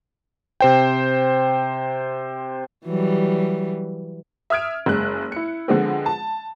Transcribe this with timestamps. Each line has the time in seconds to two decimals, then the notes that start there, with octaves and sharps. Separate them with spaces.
0.61 C3 C5 G5
2.85 E3 F#3 G3
4.50 E5 D#6 F6 G#6 D7
4.86 F#1 G#3 F#6
5.32 E4 C#7
5.68 D3 F3 G#3 B3 C4
6.06 A5